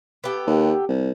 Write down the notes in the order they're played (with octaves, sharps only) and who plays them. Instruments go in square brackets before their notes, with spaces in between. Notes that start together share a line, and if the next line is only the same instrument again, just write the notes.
[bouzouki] B3 G4 A4
[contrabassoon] D#2
C2